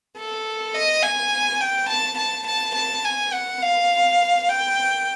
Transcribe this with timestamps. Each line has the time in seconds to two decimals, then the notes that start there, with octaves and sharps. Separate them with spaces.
0.17 A4
0.75 D#5
1.03 G#5
1.61 G5
1.89 A5
2.19 A5
2.47 A5
2.75 A5
3.05 G#5
3.33 F#5
3.63 F5
4.49 G5